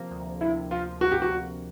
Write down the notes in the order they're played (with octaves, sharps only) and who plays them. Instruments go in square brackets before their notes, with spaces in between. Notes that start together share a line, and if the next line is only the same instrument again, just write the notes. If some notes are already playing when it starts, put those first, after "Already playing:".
Already playing: [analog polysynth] C3 F3 A#3
D2
[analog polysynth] C3 [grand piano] E4
[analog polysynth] F3 [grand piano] F4
[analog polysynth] A#3 [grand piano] F#4
[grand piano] G4
F#4
[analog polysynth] D2